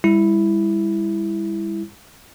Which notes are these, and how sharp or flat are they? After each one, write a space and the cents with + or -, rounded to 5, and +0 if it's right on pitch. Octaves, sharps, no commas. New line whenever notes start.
G3 +40 E4 +0